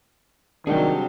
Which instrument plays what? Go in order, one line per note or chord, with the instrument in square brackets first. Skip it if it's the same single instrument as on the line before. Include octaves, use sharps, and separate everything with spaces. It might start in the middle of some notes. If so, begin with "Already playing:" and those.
[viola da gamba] C3 F#3 G3 [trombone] D#3 [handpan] D4 [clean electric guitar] G#4 F#5 G5